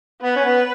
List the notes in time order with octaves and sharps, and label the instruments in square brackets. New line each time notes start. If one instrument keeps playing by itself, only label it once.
[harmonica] B3 [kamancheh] B4
[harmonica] C#4
B3